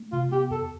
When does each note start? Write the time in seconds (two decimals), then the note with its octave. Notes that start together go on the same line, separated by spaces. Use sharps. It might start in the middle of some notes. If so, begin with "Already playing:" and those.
Already playing: A3
0.12 C3 F4
0.32 B3 G4
0.50 E2 A4